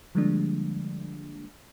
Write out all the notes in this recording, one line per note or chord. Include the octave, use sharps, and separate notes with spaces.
D3 F3 G3 G#3 A#3 D4